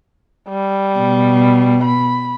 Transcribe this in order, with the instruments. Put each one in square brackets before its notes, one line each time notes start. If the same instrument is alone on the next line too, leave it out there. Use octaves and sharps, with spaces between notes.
[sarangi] G3
[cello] B2
[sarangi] B5